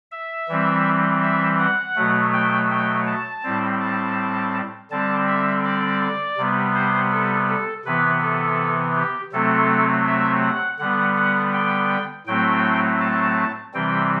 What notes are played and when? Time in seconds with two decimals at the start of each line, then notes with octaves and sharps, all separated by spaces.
0.12 E5
0.49 E3 G3 C4
1.23 E5
1.59 F#5
1.96 B2 F#3 A3
2.33 G5
2.70 G5
3.07 A5
3.43 A2 G3 C4
3.80 A5
4.91 D3 G3 C4 A5
5.28 E5
5.64 D5
6.38 C3 G3 B3
6.75 C5
7.12 A4
7.48 A4
7.85 C3 E3 B3 B4
8.22 A4
8.95 G4
9.32 C3 F#3 A3 C4 A4
10.06 E5
10.43 F#5
10.79 D3 G3 B3 F#5
11.17 F#5
11.53 G5
12.27 A2 F#3 A3 C4 G5
13.00 A5
13.74 C3 E3 G3 C4 G5